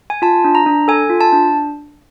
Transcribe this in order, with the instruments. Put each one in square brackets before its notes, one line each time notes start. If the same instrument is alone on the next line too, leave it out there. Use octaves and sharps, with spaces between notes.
[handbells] G#5
F4 A5
D4
A#5
D4
A4 G#5
F4
A5
D4